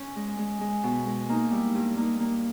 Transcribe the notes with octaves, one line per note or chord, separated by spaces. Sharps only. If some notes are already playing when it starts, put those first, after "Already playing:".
Already playing: C#4
G#3
G#3
G#3
B2
G#3
A#3 D#4
G3 E4
G2
A#3 D#4
A#3